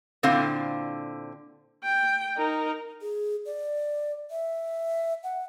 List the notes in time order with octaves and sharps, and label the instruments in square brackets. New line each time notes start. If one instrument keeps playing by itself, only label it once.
[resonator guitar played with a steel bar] A#2 D3 C4 E4 C5 F5
[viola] G5
D#4 A#4
[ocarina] G#4
D5
E5
F#5